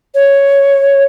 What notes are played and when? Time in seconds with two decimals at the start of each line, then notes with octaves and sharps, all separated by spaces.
0.15 C#5